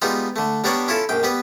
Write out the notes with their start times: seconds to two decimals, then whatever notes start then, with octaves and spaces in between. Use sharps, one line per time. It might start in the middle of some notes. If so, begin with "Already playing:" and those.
0.02 G3 G#3 B3 D#4 F4
0.36 D3 A3
0.64 G3 B3 D4 A#4 C#5 D5
0.88 C#4 E4 F4 A4
1.09 A#1 F#2 G5
1.23 G3 B3 B4